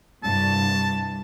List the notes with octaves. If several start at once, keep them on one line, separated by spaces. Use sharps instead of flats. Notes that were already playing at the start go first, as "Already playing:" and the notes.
C2 G2 A5